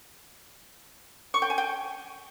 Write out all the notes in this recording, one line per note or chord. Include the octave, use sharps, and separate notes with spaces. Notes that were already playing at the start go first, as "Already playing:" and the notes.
C#6
G5
G#5
G5